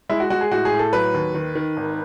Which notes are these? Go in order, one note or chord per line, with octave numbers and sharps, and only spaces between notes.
G#3 E4
F#4
G#3 F#4
G#4
A2 F#4
G#4
A2
A4
F#3 B4
D#2
D#3
D#3
G#1